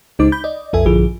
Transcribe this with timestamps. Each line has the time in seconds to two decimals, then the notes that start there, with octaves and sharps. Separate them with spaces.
0.19 C#2 C#3 G#3 D#4 C5 D6
0.32 B5 G6
0.44 D5 D#5
0.73 B1 F2 A4 E5 G#5
0.86 A#1 G2 D3 F3 G#4